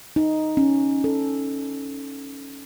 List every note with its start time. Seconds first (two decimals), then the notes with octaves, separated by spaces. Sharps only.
0.16 D#4
0.57 C#4
1.04 A4